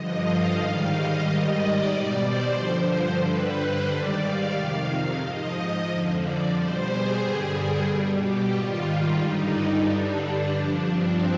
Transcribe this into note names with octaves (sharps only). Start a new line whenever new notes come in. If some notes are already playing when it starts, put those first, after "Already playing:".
Already playing: G2 D3 F3 D#5
F5
G#2 D#3 G3 F5
D#5
G#2 D#3 G3 D#5
D5
B2 G3
C5
G2 D3 F3 C5
G2 D3 G3 B4
C5
G#2 D#3 G3 D5
F5
F2 C3 D#3
G#2 F3 D#5
F2 D3 F3
D5
B2 G3 C5
G#4
G2 D3 G3
B2 G3
G4
G#2 D#3 G3 F4
G2 D3 G3 D#4
G2 D3 G3 D4
D4
G2 F3 D4
C4